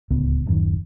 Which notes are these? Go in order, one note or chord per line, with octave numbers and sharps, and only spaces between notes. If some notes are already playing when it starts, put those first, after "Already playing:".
D1 C#2 B3
D1 F#2 D#3